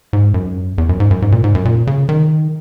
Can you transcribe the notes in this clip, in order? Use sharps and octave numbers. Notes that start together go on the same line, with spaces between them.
G#2
F#2
E2
F#2
G#2
F#2
G#2
A#2
G#2
F#2
A#2
C#3
D#3